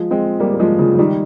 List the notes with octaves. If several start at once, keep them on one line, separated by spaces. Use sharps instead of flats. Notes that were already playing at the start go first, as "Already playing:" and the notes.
Already playing: F3 G#3
G#3 C4
G3 A#3
A#3
F3 G#3
C#3 F3
F3
D#3 G3